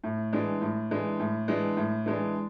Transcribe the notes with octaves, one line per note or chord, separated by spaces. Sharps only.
A2
E3 G#3 D4
A2
E3 G#3 D4
A2
E3 G#3 D4
A2
E3 G#3 D4